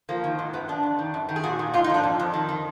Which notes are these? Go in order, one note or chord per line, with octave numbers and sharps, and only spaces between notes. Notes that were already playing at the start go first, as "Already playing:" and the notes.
F3 A#3
D#3
G#2
F#2 B3
F#2 D4
F2
D#3
F#2
D#3
G#4
A#2 F#4
A#2
G#2 F4
D#4
F3 D4
F2
F2
D#3
D#3